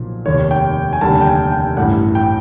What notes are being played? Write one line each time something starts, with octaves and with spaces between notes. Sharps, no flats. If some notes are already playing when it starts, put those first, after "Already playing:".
Already playing: B1 A#2 F3
F1 D#2 D#3 C#5
G5
G#5
F1 D#2 D3 G3 A5
G5
G#5
G5
A1 G2 E3 A3 F#5
G5